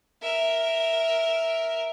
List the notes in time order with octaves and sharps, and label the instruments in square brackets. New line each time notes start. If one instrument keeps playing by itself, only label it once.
[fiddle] A#4 E5